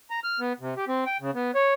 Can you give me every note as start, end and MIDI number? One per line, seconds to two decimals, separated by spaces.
0.10 0.20 82
0.24 0.40 89
0.40 0.53 59
0.60 0.74 48
0.77 0.85 67
0.88 1.04 60
1.06 1.17 79
1.20 1.31 49
1.35 1.51 59
1.55 1.74 73